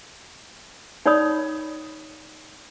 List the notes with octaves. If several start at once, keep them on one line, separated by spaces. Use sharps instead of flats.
D#4 C#5 D5 B5 D#6